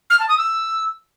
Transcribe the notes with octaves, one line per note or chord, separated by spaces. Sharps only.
F6
A5
D#6
E6